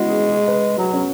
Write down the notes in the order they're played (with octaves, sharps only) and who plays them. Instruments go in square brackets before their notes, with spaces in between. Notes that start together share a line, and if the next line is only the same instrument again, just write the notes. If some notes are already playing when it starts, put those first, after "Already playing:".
Already playing: [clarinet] G#3 [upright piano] B3 C#4 E4 F#4
[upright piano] G#4
G#4
B4
[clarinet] F#3 [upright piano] F#4
[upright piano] C#4